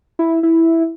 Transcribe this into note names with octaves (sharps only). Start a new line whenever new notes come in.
E4
E4